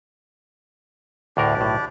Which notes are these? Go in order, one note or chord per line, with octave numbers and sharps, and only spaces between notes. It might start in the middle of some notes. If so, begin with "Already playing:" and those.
D2 A2 D4 G4 A#4 D5
B1 A2